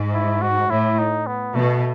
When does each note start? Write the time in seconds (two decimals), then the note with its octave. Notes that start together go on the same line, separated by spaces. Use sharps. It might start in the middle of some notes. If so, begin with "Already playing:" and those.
Already playing: G#2
0.14 E4
0.42 F#4
0.70 A2 E4
0.98 D#4
1.27 B3
1.55 B2 A3